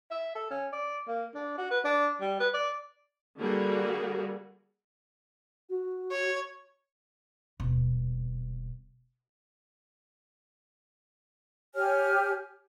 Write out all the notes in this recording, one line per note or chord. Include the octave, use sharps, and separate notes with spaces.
E5
A4
C#4
D5
A#3
D4
F#4
B4
D4
G3
B4
D5
D3 G3 A#3 F#4 G#4
F#4
C#5
D#1 B2
G4 C#5 G#5 F6